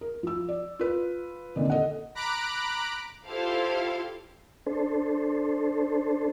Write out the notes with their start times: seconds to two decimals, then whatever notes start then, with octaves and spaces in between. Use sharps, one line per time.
0.01 A#4
0.23 F3 E6
0.49 D5
0.79 F4 B4
1.56 F2 A#2 D3 D#3 D4
1.70 A4 D#5 F#5
2.15 A#5 B5 D6 F#6 D7
3.28 E4 F4 G4 A4 C5 F5
4.67 D4 A4 C5